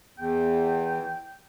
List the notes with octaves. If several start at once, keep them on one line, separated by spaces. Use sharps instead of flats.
E2 G5